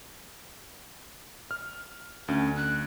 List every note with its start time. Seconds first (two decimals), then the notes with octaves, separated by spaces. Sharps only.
1.51 F6
2.28 D2 C#4
2.56 F#6